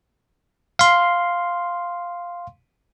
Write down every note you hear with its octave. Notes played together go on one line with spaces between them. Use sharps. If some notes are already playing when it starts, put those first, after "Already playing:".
F5 C6